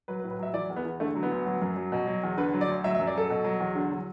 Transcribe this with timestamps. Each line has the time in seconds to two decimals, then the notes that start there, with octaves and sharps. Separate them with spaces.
0.08 F#3 B4
0.20 B4
0.24 A2
0.31 B4
0.39 F#3 E5
0.54 E3 D5
0.69 E2
0.76 B3
0.84 E3
1.00 D3 A3
1.15 F#3
1.23 B3
1.31 D2
1.46 F#3
1.62 F#2
1.76 F#3
1.92 B2
2.07 F#3
2.23 E2
2.37 D3 B4
2.53 F#3
2.61 D5
2.68 D2
2.84 F#3 E5
2.95 E5
3.00 F#2
3.07 D5
3.15 F#3 A4
3.30 B2
3.44 F#3
3.60 E2
3.75 D3
3.91 F#3